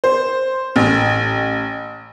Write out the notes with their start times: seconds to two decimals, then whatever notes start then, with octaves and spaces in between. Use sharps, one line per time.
0.04 C5
0.76 A1